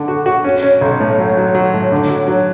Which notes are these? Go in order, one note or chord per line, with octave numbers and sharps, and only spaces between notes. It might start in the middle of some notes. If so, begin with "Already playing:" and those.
Already playing: D3
F#4
F#4
C#4
C#4
B1
A2
F#3
F#3
F#3
A2
D3
F#3
F#3